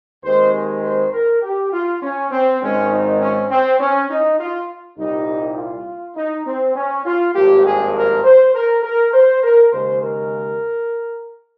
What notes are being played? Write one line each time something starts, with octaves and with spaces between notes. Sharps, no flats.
D#2 D#3 G#3 C4 C5
G#4
C5
A#4
G4
F4
C#4
C4
G#1 G#2 D#3 G#3 C4 C#4
D#4
C#4
C4
C#4
D#4
F4
C2 A#2 G3 D#4
F4
D#4
C4
C#4
F4
G#1 G2 F3 A#3 G4
G#4
A#4
C5
A#4
A#4
C5
A#4
D#2 C#3 G#3 C5
A#4